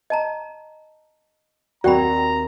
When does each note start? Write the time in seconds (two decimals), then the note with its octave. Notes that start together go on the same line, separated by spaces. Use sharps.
0.10 D#5 A5 A#5
1.84 D#2 C4 F#4 D5 G5 A#5 B5